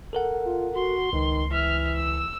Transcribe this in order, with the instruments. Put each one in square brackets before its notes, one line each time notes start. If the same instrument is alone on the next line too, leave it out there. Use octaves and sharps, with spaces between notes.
[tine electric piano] A4 A#4 F#5
[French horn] F4
[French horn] F#4 [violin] C6
[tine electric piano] C#2 [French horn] D#3
[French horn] E3 [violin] E5 F6
[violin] E6